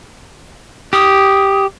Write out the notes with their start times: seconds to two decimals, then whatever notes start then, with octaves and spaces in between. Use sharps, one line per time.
0.93 G4 D#6